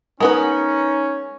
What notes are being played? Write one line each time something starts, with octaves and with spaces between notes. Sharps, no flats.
G#3 B3 C#4 D#4 A#4 B4